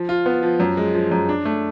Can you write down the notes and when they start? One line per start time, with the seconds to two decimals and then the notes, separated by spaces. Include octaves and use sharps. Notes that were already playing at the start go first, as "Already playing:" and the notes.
Already playing: F3
0.09 F4
0.26 B3
0.43 F3
0.60 F#2
0.77 G#3
0.94 F3
1.11 F#2
1.29 D4
1.45 A3